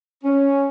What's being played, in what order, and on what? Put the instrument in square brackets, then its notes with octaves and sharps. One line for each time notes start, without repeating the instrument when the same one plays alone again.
[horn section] C#4